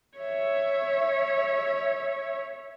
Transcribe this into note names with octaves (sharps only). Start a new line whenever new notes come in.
C#5 E5